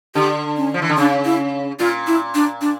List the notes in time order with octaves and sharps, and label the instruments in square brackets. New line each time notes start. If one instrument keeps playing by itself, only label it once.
[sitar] D3 [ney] G4
[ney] C#4
[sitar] F3
E3
D3
[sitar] C#3 [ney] D4
[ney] E4
[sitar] A#2 [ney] F4
[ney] E4
D4
D4